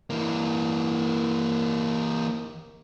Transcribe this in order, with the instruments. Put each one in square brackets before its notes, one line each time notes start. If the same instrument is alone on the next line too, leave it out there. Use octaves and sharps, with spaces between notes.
[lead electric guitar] E3 A#3